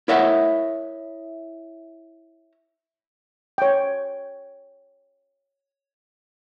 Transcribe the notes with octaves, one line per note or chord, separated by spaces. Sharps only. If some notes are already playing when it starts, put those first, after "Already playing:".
E4 A#4 C#5 D#5 E5 F#5
C#5 G5